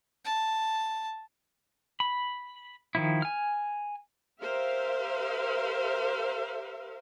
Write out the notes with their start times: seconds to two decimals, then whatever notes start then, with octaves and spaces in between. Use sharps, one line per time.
0.24 A5
2.00 B5
2.95 D#3 F3 E4
3.22 G#5 F6
4.41 G4 A#4 C5 E5 F5